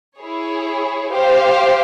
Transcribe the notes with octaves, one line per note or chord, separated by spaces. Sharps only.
E4 G#4 C#5
G4 C5 F5